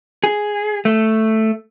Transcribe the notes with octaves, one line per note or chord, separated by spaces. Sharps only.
G#4
A3